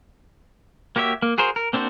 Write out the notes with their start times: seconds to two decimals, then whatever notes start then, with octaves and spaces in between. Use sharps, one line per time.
0.96 A#3 F#4 G4 C#5 E5
1.22 A#3
1.38 F#4 G#4 A#4 C5
1.56 A#4
1.73 A#3 C4 D4 F#4 C5